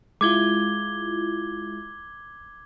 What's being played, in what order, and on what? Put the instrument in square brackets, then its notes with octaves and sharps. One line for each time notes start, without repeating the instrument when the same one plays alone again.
[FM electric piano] G#3 E4 F4 [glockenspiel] D6 G#6 G7